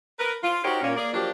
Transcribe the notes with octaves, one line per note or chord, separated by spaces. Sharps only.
A#4 B4
F4
D#4 F#4 G4 A#4 C5 C#5
A#2 A#3 C#4
A#3 G#4 D5
F3 F#3 A#3 D4 F4 G4